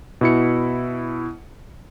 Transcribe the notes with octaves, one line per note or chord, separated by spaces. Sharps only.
B2 E4 C#7